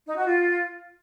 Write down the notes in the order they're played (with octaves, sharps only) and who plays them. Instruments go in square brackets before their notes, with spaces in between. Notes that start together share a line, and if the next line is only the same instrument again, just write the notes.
[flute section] D#4
F#4
F4